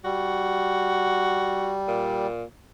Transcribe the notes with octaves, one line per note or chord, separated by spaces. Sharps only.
G3 F#4
A#2